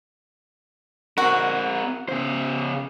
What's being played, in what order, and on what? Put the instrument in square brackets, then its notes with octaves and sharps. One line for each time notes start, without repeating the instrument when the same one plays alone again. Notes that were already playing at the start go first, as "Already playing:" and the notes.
[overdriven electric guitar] C4 A#4 [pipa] F#4
[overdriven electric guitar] C#3 C5